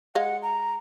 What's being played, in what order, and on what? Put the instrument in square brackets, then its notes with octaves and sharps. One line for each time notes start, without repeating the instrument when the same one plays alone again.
[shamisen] G#3 D#5 F5 [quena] F#5
[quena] A#5